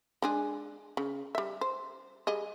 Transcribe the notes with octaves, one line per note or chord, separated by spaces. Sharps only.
G#3 D4 G#4
C#3
G3 E5
C5
G3 G#4 D#5